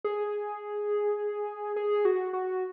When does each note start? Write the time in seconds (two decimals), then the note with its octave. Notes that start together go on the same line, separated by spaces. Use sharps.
0.04 G#4
1.76 G#4
2.05 F#4
2.33 F#4